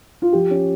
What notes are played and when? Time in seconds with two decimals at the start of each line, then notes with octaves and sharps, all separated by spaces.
0.22 F4
0.33 F3 G4
0.50 C#4